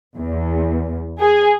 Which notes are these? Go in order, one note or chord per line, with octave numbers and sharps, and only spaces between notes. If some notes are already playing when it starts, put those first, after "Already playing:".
E2
G#4